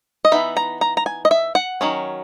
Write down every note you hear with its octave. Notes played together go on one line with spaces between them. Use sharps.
D#5
E3 B3 D#4 E5
A#5
A#5
A#5
G#5
D#5
E5
F#5
D#3 F#3 C#4